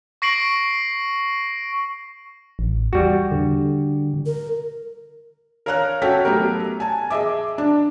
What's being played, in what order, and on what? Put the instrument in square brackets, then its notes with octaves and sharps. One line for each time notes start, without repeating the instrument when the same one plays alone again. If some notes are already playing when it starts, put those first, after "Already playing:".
[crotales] C#6 A#6 C7 D7 F#7
[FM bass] A1
[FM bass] E2 [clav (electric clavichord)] G3 F#4
[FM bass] D3
[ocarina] A#4
[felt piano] A#4 C#5 F5 A#5 F6 F#6
C#4 F#4 A4 G5 G6 B6
F#3 A3 B3 G4 A#4
G#5 A5
G#4 D#5 E5 D6
D4